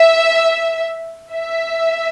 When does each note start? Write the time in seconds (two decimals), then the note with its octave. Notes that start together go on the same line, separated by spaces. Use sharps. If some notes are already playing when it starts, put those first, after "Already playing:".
Already playing: E5
1.32 E5